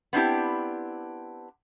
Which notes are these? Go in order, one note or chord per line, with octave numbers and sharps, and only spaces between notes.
B3 C4 D4 E4 G4